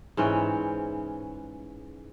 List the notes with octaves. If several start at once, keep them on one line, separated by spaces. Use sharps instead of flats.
G#2 E3 C#4 G5